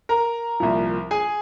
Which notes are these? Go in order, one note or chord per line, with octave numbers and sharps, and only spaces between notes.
A#4 A#5
C2 A#2 F3
G#4 G#5